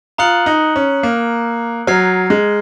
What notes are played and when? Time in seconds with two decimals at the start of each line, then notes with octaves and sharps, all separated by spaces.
0.18 F4 A#5 D#6 F#6 C#7 F#7
0.46 D#4
0.76 C#4
1.03 A#3
1.87 F#3 A#5 F6 G#6 C7
2.30 G#3